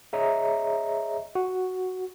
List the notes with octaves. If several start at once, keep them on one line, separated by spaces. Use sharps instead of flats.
G#4 C#5 D#5 E5 A#5
F#4